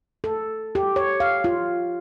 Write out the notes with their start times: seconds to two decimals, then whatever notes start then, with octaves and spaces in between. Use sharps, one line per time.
0.24 A4
0.75 G4
0.96 C#5
1.20 F5
1.44 F4